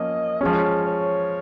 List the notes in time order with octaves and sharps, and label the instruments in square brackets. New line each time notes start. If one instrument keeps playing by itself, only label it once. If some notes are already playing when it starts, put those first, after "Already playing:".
Already playing: [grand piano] F3 A#3 C#4 [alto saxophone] D#5
[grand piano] F3 G#3 C#4 [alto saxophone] C#5
[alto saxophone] C#5